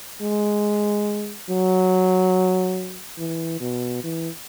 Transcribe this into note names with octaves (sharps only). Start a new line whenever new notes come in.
G#3
F#3
E3
B2
E3